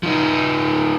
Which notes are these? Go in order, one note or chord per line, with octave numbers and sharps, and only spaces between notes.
F3 D#4